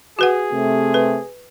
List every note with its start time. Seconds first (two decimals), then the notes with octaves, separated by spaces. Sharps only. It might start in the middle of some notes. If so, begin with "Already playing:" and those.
0.19 F#4 G#4 B4 F#5
0.53 C3 A3
0.94 B4